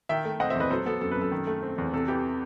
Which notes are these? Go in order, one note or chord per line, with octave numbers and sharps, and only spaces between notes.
D#3 E5 G5
A3
C4 D#5 F#5
C5 E5
E2 B4 D#5
F#3 A4 C5
B3 A4
F#2 A4
B4
F#2 A4
D#3
A3
C4
E2
C3 A4
E3 G4